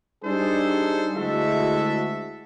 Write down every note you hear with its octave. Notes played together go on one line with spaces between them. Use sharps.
G3 D4 D#4 G#4 A4 C5
D2 G#3 E4 F#4 A4 E5